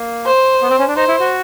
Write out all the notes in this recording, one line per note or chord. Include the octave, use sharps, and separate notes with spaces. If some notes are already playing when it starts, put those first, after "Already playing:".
Already playing: A#3
C5
B3
C4
C#4
D4
D#4 C5
E4
F#4